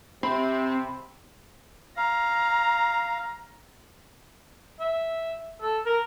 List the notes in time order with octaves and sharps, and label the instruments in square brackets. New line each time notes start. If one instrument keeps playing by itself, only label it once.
[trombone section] C3 [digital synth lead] C4 [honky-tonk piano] B5
[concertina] F5 [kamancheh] A#5
[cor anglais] E5
A4
A#4